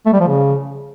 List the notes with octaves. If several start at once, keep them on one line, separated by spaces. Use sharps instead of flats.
A3
G3
F3
C#3